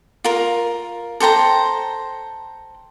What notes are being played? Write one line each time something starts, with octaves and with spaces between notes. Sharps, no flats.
F4 A#4
A4 C5 G5 A#5